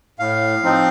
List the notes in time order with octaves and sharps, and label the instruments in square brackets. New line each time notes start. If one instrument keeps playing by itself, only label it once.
[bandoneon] A2 F5
F3 C4 D#4